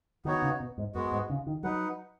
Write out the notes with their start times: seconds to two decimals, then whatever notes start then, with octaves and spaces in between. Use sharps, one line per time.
0.25 D#3 B3 D#4 F#4 C#5
0.42 C#3
0.60 B2
0.78 G#2
0.95 F#2 G#3 B3 F#4
1.12 G#2
1.30 C#3
1.47 D#3
1.63 F#3 D#4 B4 F#5